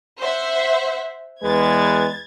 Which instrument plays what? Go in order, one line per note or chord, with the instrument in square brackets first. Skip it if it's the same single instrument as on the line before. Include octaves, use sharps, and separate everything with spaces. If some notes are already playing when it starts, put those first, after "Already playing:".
[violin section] C5 E5 F#5
[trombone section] E2 G#3 B4 [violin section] G#6 A6